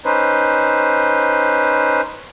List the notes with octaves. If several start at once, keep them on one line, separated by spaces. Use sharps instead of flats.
C#4 D#4 B4 C5